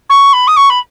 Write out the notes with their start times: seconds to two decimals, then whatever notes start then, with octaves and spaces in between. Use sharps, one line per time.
0.09 C#6
0.33 B5
0.47 D#6
0.57 C#6
0.70 B5